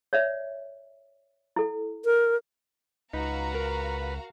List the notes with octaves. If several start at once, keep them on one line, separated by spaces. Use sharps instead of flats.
C#5 D5 E5
E4 A4
A#4
C#2 D#4 F#4 B4 F5 A#5
A#4